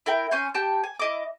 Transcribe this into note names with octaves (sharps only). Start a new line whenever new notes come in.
E4 A#4 G5
C#4 G#5 C6 G6
G4 G5 A5 G6
G#5
E4 D#5 D6